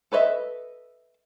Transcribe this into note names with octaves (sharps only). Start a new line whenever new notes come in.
A4 B4 C#5 D#5 E5